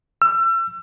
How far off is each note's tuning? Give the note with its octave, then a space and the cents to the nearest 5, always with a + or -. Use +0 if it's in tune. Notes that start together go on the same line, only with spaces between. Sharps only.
E6 +35